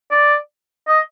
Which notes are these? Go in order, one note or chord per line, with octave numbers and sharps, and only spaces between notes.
D5
D#5